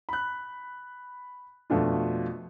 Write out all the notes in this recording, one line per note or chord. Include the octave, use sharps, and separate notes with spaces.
B5 F#6
F2 B2 A3 D4 F4